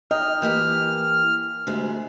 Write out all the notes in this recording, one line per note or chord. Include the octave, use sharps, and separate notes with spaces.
D#5 G5 F6
E3 A#3 G4
D2 C3 G#3